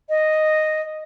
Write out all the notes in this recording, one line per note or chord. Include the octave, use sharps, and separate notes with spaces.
D#5